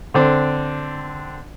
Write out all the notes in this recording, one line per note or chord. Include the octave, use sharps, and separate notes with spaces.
D3 C4 D4